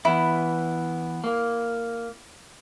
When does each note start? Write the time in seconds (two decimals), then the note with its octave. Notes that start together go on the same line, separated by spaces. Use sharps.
0.05 E3 B3 E4
1.24 A#3